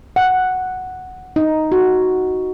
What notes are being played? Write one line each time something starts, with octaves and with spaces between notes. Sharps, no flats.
F#5
D#4
F#4